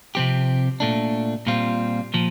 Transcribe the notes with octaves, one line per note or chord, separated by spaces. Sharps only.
C3 F3 C4 G4
A#2 A3 D4
A#2 G3 C4 F4
A#2 F3